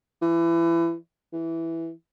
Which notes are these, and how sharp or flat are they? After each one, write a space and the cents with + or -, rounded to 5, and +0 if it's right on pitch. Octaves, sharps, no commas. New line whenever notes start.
E3 +25
E3 +0